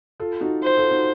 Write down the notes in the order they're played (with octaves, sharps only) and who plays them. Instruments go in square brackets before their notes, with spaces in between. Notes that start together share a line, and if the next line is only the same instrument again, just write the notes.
[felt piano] F4 A4
D#4 F#4
[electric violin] C5
[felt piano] F4 A4
D#4 F#4